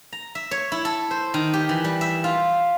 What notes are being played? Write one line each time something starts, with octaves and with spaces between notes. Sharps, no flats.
A#5
E5
C#5
E4
A4
C5
D#3
G4
E3
G3
E5
F4